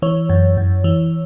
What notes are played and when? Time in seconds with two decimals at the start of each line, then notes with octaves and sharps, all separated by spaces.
0.02 E3 C#5
0.30 F#2
0.57 F#2
0.84 E3